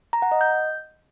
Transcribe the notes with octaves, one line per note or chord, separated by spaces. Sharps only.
A#5
F#5
D#5
G6